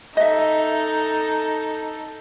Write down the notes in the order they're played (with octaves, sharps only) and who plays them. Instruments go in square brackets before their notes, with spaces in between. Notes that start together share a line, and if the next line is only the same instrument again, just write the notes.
[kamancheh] D#4 A4 [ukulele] D#5 E5